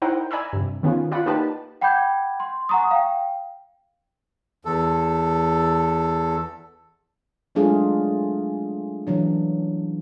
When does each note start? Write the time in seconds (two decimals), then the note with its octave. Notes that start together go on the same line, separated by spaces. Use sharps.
0.02 D#4 E4 A#4 C5 F#5 G5
0.31 D5 G#5 A#5 B5 E6
0.53 G2 C3
0.83 D#3 B3 C#4 F4
1.11 F4 D5 F#5 B5
1.26 A#3 D#4 G4 B4 A5
1.81 F#5 G5 B5 D6 G6 G#6
2.40 C6
2.69 F#5 G#5 A#5 C#6 D#6
2.91 F5 G5
4.65 E2 A4
7.55 F#3 G#3 A3 D4 F4 G#4
9.07 E3 F#3 D4